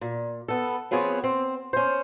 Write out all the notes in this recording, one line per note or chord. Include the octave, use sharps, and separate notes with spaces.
A#2
B3 A4
F3 B3 C4 G#4 C#5
C4
C#4 C5